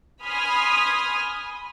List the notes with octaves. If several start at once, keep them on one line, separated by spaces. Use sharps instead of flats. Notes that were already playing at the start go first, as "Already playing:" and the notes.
G#5 B5 C6 D#6 F6 G#6